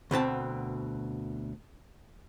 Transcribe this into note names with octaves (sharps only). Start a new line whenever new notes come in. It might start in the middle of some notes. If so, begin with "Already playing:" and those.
D2 B2 C4 A5